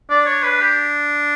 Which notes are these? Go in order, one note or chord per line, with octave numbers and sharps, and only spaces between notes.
D4 D5
C#5
B4
G4